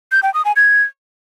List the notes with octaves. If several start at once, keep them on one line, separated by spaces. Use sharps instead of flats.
G6
G5
D#6
G#5
G#6